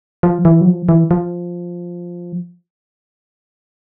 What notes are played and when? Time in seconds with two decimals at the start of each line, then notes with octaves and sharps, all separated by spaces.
0.23 F3
0.45 E3
0.61 F#3
0.67 F3
0.89 E3
1.11 F3